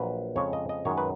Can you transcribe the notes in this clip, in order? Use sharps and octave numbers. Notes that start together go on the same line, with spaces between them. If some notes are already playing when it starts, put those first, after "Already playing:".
Already playing: A#1 A#2 F#3 B4
F2 C#3 G#3 C#5
D#5
D#5
F#2 D#3 G#3 C#5
B4